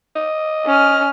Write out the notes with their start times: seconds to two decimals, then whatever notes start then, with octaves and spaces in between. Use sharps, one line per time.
0.16 D#5
0.66 C#4 F6